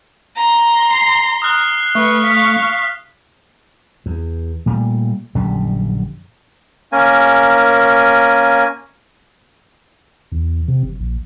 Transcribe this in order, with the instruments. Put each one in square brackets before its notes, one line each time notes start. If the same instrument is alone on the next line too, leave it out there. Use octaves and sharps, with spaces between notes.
[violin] A#5 C6
[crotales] C7 G7
D#6 F6 F#6
[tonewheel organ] A3 [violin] B4 [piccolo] C#6
[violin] F5 [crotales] B6
[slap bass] E2
A#2 G3 A3
A#1 F#2 D3 G3
[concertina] A#3 C#4 A#4 G#5
[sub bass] E2
C3
F#1
A#1